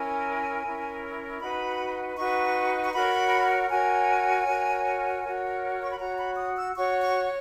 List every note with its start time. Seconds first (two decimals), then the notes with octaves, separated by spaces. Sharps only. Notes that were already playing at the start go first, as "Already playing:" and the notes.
Already playing: C#4 E4 A#4 G#5
0.63 C#4 E4 A#4
1.40 D#4 F#4 B4 B5
2.17 D#4 F#4 B4 C#6
2.85 C#6
2.92 F#4 A#4 C#5 B5
3.70 F#4 A#4 C#5 G#5
4.46 F#4 A#4 C#5
5.23 F#4 A#4 C#5
5.82 C#6
5.91 B5
5.99 F#4 C#5 A#5
6.19 B5
6.37 D#6
6.56 E6
6.76 F#4 C#5 C#6
7.01 C#6